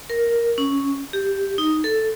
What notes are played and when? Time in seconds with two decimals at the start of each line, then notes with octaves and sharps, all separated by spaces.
0.10 A#4
0.58 C#4
1.13 G4
1.58 D#4
1.84 A4